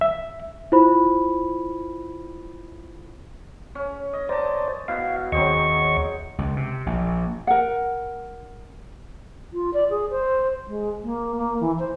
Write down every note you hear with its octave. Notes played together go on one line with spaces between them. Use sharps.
E5
E4 F4 C5 B5
C#4
D#5
C5 D5 A5 A#5
B2 E4 F5
D#2 F#3 C4 G#4 D#5 C#6
C#2
C3
A#1
A#4 F#5
F4
D5
G#4
C5
G#3
A#3
A#3
E3
C5